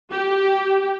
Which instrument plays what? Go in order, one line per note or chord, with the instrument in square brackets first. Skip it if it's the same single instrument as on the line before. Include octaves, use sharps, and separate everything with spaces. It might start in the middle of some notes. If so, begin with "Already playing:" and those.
[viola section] G4